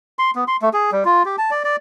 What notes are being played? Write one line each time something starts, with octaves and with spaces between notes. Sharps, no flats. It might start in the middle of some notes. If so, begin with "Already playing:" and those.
C6
B3
C6
A3
G#4
G3
F4
G4
A5
D5
D5